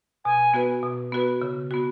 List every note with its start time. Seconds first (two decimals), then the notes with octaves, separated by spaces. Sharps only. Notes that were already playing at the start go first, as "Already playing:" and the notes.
0.25 B2 G#5
0.54 B3 F#4 B4
0.83 B2
1.12 B3 F#4 B4
1.42 C#3
1.71 B3 F#4